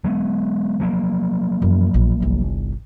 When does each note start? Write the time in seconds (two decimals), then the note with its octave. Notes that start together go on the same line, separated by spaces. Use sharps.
0.04 F#3 G#3 B3
0.80 F3 F#3 A#3
1.62 F#2 E3
1.94 A#1
2.21 G1 C2